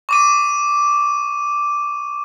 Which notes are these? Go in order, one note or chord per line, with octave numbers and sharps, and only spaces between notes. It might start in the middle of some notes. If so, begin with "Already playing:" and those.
C#6 D6 D#7